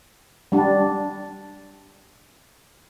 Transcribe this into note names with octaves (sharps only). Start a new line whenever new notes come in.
G3 D4